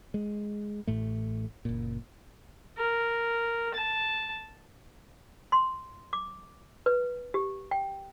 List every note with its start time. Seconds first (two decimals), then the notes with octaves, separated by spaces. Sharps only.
0.14 G#3
0.87 A1 A2 A3
1.65 F#1 A#2
2.78 A#4
3.74 A5
5.52 C6
6.13 D6
6.86 B4
7.34 G4
7.71 G5